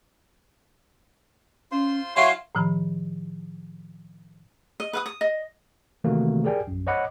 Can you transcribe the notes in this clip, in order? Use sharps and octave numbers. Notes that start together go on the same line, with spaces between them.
C#4 F4 C5 C6
F#3 E4 F4 C#5 E5 F5 G#5 C6
A2 D#3 F3 B5
D#5
B4 F5 D#6
D#6
D#5
C3 D#3 E3 A3 A#3 F#4
G4 G#4 A#4 D5 G5 G#5
A#1 F#2
C5 C#5 D#5 F#5 B5 D6